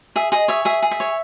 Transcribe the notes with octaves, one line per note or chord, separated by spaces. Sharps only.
G#4 E5
G#4 D#5
C#5 E5
G#4 E5
G#4
E5
C#5